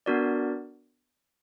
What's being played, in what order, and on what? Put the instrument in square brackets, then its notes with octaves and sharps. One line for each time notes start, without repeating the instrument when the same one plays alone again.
[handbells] B3 D4 F#4 A#4 D5